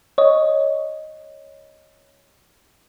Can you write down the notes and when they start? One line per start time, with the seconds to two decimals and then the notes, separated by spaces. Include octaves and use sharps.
0.18 C#5 D#5